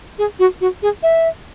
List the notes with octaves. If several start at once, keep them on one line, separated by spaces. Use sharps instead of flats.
G#4
F#4
F#4
G#4
E5